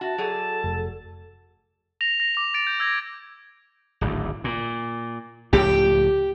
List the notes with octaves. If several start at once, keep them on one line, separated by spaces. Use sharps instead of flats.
F#4 E5 A5
F#3 G#4 A4 D5
F1
A#6 F7
A#6
D6 F7
A6 D7
G6
E6 G#6 A#6
D1 G#1 D2
A#2
C#2 A2 F3 G4